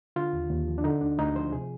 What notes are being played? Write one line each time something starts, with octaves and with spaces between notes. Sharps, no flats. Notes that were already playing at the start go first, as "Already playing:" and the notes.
D3 F4
D#2
D#2
F3
D4
D3 D#4
D2 D4
D2 D#4
F3 C5
C3 G#4